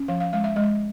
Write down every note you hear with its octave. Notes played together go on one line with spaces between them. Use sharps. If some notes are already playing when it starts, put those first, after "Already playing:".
Already playing: C#4
F3 F5
F5
G#3 F5
E5
G#3 D#5